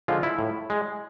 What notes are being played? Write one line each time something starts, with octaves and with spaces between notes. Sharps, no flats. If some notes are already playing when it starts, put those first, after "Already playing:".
D3 F3 G#3 F4
E4
A2
G#3